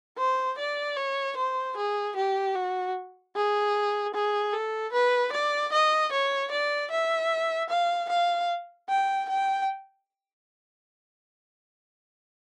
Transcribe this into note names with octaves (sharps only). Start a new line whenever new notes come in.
C5
D5
C#5
C5
G#4
G4
F#4
G#4
G#4
A4
B4
D5
D#5
C#5
D5
E5
F5
F5
G5
G5